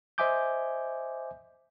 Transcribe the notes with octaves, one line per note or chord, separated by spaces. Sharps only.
C5 D#5 E5 G#5 D6 G6